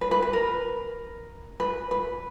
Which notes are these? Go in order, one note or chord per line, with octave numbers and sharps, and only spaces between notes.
B4
B4
B4
A#4
B4
B4